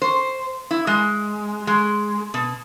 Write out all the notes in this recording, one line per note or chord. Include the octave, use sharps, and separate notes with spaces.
C5
E4
G#3
G#3
B2